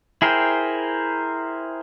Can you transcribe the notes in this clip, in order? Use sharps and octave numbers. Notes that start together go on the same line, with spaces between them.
E4 G#4 A#4 C5 G5